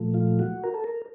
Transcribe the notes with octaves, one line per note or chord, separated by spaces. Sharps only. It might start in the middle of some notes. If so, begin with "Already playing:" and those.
Already playing: A#2 F3 A3
F4
F#4
A#4
A4
A#4